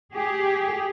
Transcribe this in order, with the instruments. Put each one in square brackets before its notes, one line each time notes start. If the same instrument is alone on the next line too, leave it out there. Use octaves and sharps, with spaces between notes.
[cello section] G4 G#4